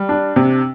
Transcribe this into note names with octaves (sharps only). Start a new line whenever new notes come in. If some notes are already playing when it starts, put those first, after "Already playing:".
Already playing: G3
D4
C3